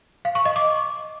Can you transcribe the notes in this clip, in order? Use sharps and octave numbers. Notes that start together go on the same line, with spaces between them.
F5
C#6
D#5
D6